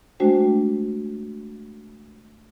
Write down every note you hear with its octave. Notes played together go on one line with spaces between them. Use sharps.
G#3 A3 D4 F#4 C5 G5